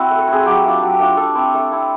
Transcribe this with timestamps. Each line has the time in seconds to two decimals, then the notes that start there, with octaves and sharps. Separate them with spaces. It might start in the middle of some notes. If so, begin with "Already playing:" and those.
Already playing: C4 E4 F#4
0.11 A3
0.18 A4
0.28 C4 E4 G#4
0.46 F#3 G4
0.64 A3 D4 F4
0.82 F#3
0.99 A3 D4 F4
1.17 A3 A4
1.35 C4 E4
1.54 A3
1.71 C4 E4